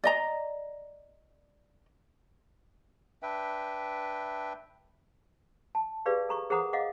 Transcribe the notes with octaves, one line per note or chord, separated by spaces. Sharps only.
D5 D#5 A#5
D4 B4 E5 G5
A5
G4 G#4 B4 D5 F5
A4 A#5 C#6
G#4 A#4 C5 F#5 A#5 D#6
D#5 F5 F#5 D6